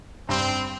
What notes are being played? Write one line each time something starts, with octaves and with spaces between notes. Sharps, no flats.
G2 C4